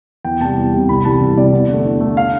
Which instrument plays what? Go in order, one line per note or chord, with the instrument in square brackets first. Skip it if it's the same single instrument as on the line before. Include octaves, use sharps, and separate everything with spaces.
[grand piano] E2 G5
C3 G3 A5
E2
C3 G3
C2 B5
C3 E3 G3 A5
C2
C3 E3 G3 D5
E2
D3 A3
E2
D3 A3
F5